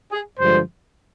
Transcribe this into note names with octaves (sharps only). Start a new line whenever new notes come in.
G#4
G2 D3 F3 G#3 C5